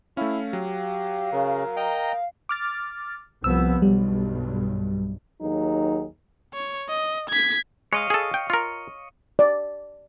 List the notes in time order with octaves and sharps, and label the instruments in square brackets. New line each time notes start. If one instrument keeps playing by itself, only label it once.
[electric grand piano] A3 C#4 [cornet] E4 [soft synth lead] F5
[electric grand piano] F#3 [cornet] G4
[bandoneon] C#3 [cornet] A#4
[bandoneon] D#5 G5 A#5
[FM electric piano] D6 F6 A6
[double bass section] C2 F3 B3 [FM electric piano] E6
[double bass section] B1 G2 [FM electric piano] G3
[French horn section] D#2 F#3 D#4 G#4
[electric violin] C#5
D#5
G#6 B6
[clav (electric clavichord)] G#3 [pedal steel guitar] C#5 D#5 F5
[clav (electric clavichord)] G#4 A4
G5
F4 A#4
[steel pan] D5